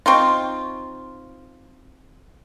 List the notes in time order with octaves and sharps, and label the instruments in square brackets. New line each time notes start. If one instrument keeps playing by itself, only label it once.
[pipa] C4 D#4 F4 [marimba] C6 C#6